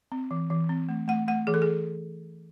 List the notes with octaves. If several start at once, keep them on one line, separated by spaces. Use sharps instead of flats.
C4
E3
E3
C4
A3
A3 F#5
A3 F#5
E3 G#4
A4
G#4